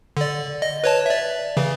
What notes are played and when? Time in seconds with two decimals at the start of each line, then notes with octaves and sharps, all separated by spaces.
0.17 D3 D5
0.62 D#5
0.84 B4 C#5 A5
1.06 D5 E5
1.57 C#3 E3